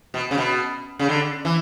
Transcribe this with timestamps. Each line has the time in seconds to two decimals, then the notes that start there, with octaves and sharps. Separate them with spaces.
0.14 B2
0.31 C#3
0.37 B2
0.99 C#3
1.09 D3
1.45 E3